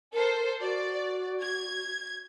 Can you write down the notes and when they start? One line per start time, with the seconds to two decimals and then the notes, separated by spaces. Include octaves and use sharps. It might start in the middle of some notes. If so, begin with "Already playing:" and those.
0.13 A4 A#4 C5
0.61 F#4 D5
1.41 G#6